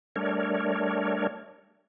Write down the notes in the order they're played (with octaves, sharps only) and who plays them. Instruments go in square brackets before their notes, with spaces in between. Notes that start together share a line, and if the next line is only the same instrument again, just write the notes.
[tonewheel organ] G3 A3 D4 A#4 C#5